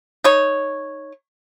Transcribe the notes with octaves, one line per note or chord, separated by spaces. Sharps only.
D#4 C#5